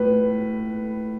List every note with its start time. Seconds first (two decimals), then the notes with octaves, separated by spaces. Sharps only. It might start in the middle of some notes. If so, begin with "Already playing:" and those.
Already playing: A2 B4